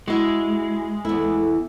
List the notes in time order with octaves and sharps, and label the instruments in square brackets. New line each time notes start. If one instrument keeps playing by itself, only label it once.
[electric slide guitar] G#3 [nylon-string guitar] E4 F#4
[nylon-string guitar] E2 E4 [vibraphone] A4